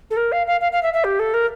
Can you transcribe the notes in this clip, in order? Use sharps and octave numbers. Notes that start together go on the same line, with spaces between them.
A4
A#4
F5
F5
F5
F5
E5
E5
G4
A4
A#4